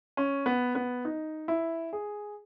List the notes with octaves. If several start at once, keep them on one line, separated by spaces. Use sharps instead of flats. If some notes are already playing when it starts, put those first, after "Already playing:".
C#4
B3
B3
D#4
E4
G#4